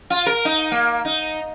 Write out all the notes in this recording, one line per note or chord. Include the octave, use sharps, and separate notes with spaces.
F4
A#4
D#4
A#3
D#4